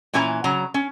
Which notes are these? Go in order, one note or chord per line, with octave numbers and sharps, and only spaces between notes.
A#2 E3 C#4 B4 G#5 A#5
C#3 F#3 A#5
C#4